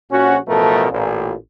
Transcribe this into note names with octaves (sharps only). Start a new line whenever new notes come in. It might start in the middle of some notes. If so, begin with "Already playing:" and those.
A#1 C#4 F#4
A1 B2 F3 A3 A4 A#4
A1 A#2